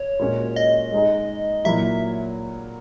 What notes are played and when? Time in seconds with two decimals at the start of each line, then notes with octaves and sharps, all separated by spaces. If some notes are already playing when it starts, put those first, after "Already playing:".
Already playing: C#5
0.19 A#2 G#3 C#4 F#4
0.56 D#5
0.92 G#3 D#4 G#4
1.64 A#2 F#3 A#3 E4 E5